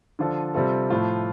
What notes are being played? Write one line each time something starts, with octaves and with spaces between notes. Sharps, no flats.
D3 F3 D4 F4 A4
C3 G3 C4 F4 A4
A2 F3 A3 F4